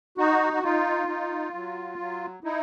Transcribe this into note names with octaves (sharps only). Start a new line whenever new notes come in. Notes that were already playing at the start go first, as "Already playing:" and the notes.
D#4 F#4
F#4
D#4 F4
D#4
F#3
F#3
D#4 E4